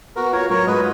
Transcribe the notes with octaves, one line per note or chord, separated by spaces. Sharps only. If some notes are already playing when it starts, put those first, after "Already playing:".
B3 F#4 A#4
F4 A#4 C#5
F#3 A#4 C#5
G#2 B4 D#5